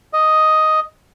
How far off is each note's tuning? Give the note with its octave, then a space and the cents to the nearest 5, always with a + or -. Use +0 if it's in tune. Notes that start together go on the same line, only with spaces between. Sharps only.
D#5 +5